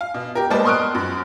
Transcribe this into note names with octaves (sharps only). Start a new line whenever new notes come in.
F5
B2
G4 A#4
G3 G#3 A#3 B3 C5 A5
C6 C#6 D#6 F6 F#6 D7
F#2